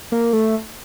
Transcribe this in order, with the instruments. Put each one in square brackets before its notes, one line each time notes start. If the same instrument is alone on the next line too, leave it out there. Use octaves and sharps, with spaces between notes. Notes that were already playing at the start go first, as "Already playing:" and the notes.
[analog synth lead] A#3
A3